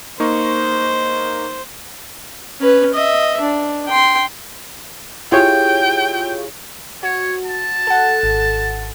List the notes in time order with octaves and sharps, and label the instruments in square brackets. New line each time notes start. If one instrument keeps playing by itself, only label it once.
[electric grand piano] A#3 D#4 C#6 [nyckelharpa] C5
[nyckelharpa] C#4 B4
D#5 E5
D4
G5 C6
[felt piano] E4 G4 [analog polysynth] F4 G#4 C#5 [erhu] G5
[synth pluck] F#4 [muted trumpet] C#5
[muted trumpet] A5
[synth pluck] A4 F#5
G#1